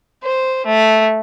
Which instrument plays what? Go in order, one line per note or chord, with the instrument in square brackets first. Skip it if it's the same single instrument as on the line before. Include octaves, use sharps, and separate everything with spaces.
[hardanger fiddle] C5
A3